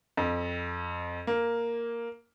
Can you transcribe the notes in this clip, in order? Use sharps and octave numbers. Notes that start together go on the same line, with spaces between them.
F2
A#3